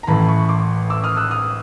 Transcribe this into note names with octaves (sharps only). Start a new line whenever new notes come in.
A#5
A1 A2 E3 A5 B5
B5 C#6
C6 D6
D6 E6
D#6 F6
E6 F#6
D#6 F6